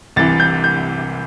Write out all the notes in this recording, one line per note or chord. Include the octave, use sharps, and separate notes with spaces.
C2 C3 E3 A6
G6
G6